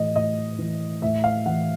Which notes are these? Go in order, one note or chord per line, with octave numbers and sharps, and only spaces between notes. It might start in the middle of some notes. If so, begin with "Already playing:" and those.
Already playing: A2 E3 D#5
A2 D#5
E3
A2 E5
F5
E3 F#5